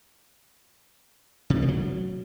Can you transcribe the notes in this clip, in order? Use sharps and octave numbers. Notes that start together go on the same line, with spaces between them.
C3
G#3
A#3
F#3